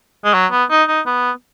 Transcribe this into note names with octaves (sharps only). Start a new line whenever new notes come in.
G#3
F#3
B3
D#4
D#4
B3